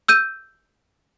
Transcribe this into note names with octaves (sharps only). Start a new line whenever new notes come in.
E6 G6 D#7